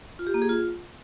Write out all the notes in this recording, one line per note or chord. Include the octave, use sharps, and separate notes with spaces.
F4
G4
A#3
G#4
F4